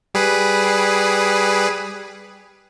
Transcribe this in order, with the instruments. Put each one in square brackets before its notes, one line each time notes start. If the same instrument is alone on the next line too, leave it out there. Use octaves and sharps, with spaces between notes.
[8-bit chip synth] G3 G#4 B4